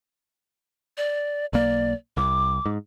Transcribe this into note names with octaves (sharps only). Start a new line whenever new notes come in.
D5
B1 A#3 D5
C2 D6
G#2